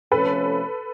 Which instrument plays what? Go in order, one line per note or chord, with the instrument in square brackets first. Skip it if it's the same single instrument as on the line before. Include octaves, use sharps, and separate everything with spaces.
[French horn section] C3 F3 A3 C#4 [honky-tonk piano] A4 B4